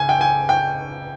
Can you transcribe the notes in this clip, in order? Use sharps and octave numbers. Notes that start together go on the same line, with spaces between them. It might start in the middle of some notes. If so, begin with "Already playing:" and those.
Already playing: C#2 G#5
G5
G#5
G5